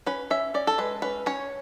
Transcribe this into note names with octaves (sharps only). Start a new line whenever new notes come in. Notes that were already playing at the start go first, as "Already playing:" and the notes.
C#4 B4
C#4 E5
C#4 D5
A4
G#3 B4
C#4 B4
C#4 C#5